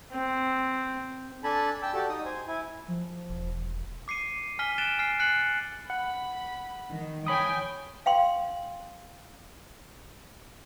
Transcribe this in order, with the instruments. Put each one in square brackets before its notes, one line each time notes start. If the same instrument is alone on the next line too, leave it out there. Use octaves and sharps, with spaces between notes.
[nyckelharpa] C4
[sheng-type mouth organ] D4 A4 G#5 A5 B5
G5 A5 E6
F#4 G4 A4 D5
D#4 D#6
C5 G#5
E4 G#5
[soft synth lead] F3
[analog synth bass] E1
[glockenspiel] D6 C7 C#7 D#7
G#5 F6 B6 D#7 G7
F#6 A6 D7 E7 G7
G#5 F6 C7
F#6 A6 C7 C#7 F#7
[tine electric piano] F#5 [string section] B5
[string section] D#3
[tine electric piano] C#5 B5 D#6 [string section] G5 G#5
[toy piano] F5 G5 C6